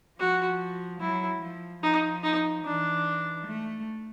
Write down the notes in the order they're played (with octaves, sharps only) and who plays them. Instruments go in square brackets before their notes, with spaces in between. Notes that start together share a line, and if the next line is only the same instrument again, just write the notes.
[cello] F3 [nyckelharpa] F#4
[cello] F#3 [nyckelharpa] E4
[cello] F3
[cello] F3 [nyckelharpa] D#4
[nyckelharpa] D#4
[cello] E3 [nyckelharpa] D4
[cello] A3